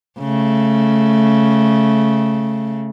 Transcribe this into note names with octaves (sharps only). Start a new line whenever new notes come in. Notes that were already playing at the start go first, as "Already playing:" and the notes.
C#3 A3